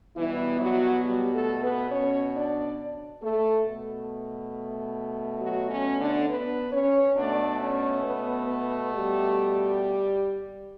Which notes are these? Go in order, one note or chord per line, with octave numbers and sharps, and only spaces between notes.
B2 E3 G3 B3 E4
F#3 F#4
G3 G4
A3 A4
B3 B4
C#4 C#5
D4 D5
A3 A4
B2 A3
F#3 F#4
C#4
D3 D4
B3 B4
C#4 C#5
B2 A3 D4 D5
C#4 C#5
B3 B4
B3 B4
G3 G4